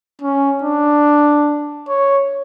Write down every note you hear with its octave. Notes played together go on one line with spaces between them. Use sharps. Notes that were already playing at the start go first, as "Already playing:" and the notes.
C#4
D4
C#5